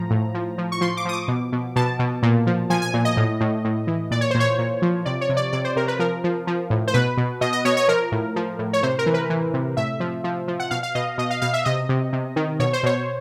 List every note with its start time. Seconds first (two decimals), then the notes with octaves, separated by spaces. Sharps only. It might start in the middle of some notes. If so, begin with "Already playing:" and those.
Already playing: A2 F3 A#5
0.10 A2
0.34 F3
0.58 F3
0.72 C#6
0.81 F3 C6
0.97 D6
1.05 F3 D#6
1.13 D6
1.28 B2
1.52 B2
1.76 B2 A5
1.99 B2
2.23 A#2
2.47 F3
2.70 F3 G#5
2.82 G#5
2.94 A#2
3.05 D#5
3.17 A2
3.41 A2
3.65 A2
3.87 E3
4.11 A#2 D5
4.21 C#5
4.31 A#2 C5
4.40 C#5
4.59 A#2
4.82 F3
5.05 C3 D5
5.21 C#5
5.29 C3
5.37 D5
5.52 C3 D5
5.65 C5
5.76 C3 A#4
5.88 B4
5.99 F3 A#4
6.24 F3
6.47 F3
6.70 A2
6.87 C5
6.94 B2 B4
7.17 B2
7.41 B2 D#5
7.53 D#5
7.65 B2 C#5
7.77 C#5
7.88 F3 A#4
8.12 A2
8.36 F3
8.59 A2
8.73 C#5
8.83 C3 C5
8.99 A#4
9.06 E3
9.14 B4
9.30 E3
9.54 C3
9.77 A2 E5
10.00 F3
10.24 F3
10.48 F3
10.60 F#5
10.71 B2 F5
10.83 F5
10.95 B2 D#5
11.18 B2 D#5
11.30 F5
11.42 B2 F5
11.53 E5
11.65 C3 D#5
11.89 C3
12.13 C3
12.36 D#3
12.60 B2 C#5
12.73 C5
12.83 B2 C#5